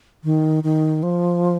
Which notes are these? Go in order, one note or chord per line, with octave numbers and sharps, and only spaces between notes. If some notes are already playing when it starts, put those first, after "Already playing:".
D#3
D#3
F3